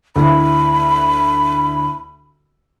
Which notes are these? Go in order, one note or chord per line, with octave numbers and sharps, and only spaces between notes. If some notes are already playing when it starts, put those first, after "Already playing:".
D2 E4 B5